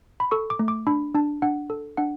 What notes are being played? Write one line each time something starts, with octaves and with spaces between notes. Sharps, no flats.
B5
A4 C#6
D6
A3
D6
D4 B5
D4 A5
D4 F#5
A4
D4 F#5